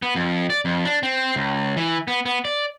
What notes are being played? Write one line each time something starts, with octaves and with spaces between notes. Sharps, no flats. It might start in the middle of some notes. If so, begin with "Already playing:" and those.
B3
F2
D5
F2
D4
C4
C#2
E3
B3
B3
D5